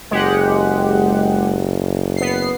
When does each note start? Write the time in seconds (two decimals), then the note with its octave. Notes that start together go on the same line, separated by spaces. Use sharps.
0.11 F#1 G#3 G4 F#5
2.17 B3 C7